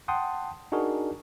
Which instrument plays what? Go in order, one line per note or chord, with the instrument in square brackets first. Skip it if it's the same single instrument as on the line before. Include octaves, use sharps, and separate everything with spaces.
[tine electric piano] F#5 G5 A5 C6 D#6
D4 D#4 F#4 G#4 A#4